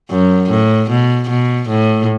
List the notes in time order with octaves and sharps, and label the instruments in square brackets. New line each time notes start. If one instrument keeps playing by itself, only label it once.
[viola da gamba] F#2
A2
B2
B2
A2